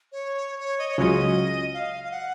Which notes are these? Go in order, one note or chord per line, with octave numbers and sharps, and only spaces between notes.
C#5
C#5
D#5
C#5
C#2 C#3 F#3 C#4 F4 D#5
F5
F5
F#5